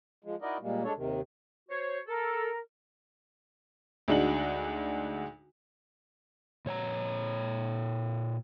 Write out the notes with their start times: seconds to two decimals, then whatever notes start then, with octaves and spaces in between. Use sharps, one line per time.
0.24 F3 G#3
0.42 D#4 E4 F#4 A#4 D5 D#5
0.61 A#2 G3 G#3 A#3
0.84 G#3 D4 A4 C#5
0.97 D#2 C3 D#3
1.69 F#4 C5 C#5
2.07 A4 A#4
4.08 D2 G#3 D4 D#4 F#4 F#7
6.66 A#2 C#5 G#5 A#5